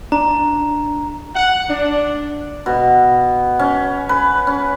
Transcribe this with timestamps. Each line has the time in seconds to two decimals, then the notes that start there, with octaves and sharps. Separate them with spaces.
0.12 D4 A#5
1.35 F#5
1.70 D4
2.66 B2
3.59 C#4
4.09 B4
4.47 C#4